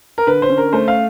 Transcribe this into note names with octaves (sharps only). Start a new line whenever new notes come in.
A#4
D3 B4
C5
C#4
A#4
A3 C5
F5